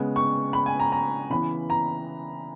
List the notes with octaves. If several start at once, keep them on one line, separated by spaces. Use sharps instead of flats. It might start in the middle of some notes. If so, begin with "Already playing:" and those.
Already playing: C#3 G#3 B3
C#6
B5
G#5
A#5
A#5
C#3 E3 B3 B5
A#5